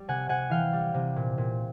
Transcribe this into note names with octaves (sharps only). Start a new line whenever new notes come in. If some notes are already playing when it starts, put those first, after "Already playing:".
Already playing: G3
C3 F#5 G#5
C3 F#5 G#5
E3 F5 G5
G3
C3
A#2
A#2